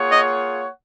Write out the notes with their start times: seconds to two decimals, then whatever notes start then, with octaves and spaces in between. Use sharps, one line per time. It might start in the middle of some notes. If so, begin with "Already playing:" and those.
Already playing: A#3 F4 G#4 C#5 F#5
0.12 D#5